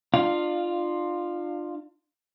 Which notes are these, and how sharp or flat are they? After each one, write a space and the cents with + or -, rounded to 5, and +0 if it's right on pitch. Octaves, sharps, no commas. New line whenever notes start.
D4 +40 F4 +0 F5 +10